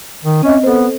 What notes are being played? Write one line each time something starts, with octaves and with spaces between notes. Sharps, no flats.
D#3
C4 C#4 D#5 E5
B3 A4 C5